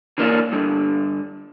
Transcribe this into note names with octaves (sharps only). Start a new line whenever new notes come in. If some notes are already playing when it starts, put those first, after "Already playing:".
D3 E3 A#3 D4
G2 D3